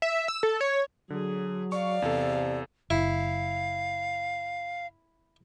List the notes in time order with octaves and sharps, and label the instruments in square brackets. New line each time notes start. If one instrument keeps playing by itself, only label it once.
[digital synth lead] E5
E6
A4
C#5
[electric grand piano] D3 [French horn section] F#3 [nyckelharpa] G#4
[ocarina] D5 [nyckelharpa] F5 [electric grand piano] C#6
[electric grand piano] E2 A4 [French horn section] C3
[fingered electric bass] F#1 [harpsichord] E4 [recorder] F5